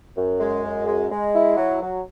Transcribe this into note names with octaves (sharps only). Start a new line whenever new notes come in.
F#2
G#3
F#2
G#3
G#3
E4
F#3
F#3